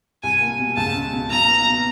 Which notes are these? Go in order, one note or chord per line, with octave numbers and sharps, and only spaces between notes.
C2 G#5
A#3
B2
C#2 A5
C#4
B2
B1 A#5
B3
B2